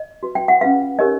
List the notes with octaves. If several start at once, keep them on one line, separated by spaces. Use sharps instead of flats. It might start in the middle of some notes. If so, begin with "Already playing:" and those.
Already playing: D#5
F#4 B4
G5
F#5
C#4 F4 G#4 B4 F5
D#4 G4 A#4 C#5 D#5